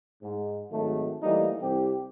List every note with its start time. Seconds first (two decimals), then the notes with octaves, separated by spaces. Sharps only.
0.22 G#2
0.70 G#1 D#3 F#3 A3
1.23 E3 G3 A3 A#3 D#4
1.60 C2 C4 G4